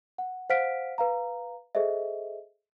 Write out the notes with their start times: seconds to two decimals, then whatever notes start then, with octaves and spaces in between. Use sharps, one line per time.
0.18 F#5
0.50 C5 F5 F#5 F6 B6 D7
0.98 B4 F5 A#5
1.75 G#4 A4 C5 D#5 E5